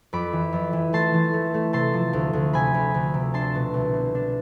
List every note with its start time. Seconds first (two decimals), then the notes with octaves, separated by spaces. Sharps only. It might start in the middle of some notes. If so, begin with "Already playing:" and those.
0.13 F2 B5 D6
0.33 E3
0.53 F2
0.73 E3
0.93 A3 A5 C6
1.14 E3
1.33 A3
1.54 A3
1.73 C3 A5 C6
1.93 F3
2.13 D2
2.33 D2
2.53 C3 G#5 B5
2.74 D2
2.94 D2
3.14 C3
3.34 D4 A5 C6
3.55 B2
3.74 C2
3.94 B2
4.15 D4